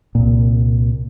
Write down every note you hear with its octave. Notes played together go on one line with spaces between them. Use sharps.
C2 A#2